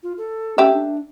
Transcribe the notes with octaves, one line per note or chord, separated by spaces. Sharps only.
F4
A4
A3 C#4 G4 E5
D4